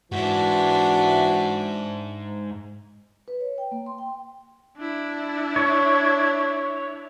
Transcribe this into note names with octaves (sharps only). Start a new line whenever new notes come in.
G#2 E3 G#3 D4 F#4 E5
B4
C#5
G5
A#3
C6
G5
D4 E4
C#5